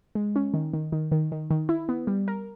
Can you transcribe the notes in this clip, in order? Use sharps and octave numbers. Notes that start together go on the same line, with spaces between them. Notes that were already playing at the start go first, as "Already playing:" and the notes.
G#3
C#4
D#3
D#3
D#3
D#3
D#3
D#3
E4
B3
G3
A#4